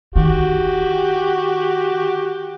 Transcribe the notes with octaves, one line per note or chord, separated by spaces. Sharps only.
D#3 F#4 G4